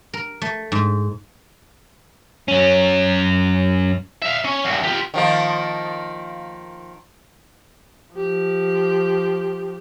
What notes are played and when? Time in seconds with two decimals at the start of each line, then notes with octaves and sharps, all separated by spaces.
0.13 A#4
0.42 A3
0.72 G#2
2.48 F#2 C#4
4.22 E5 F5
4.45 C#4
4.65 E2 G2
4.84 F4 G4
5.14 D#3 F3 A#3
8.14 F3 G4